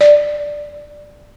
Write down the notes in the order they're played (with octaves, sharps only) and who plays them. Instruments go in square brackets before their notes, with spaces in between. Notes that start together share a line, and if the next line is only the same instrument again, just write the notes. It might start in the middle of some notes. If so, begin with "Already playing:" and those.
[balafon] D5